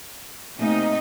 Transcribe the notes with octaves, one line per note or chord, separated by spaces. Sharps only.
C3 A3 A#3 D#4 D#5 G#5